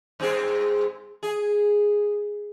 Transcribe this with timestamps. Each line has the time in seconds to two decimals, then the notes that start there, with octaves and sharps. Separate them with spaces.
0.20 G2 C4 G#4
1.23 G#4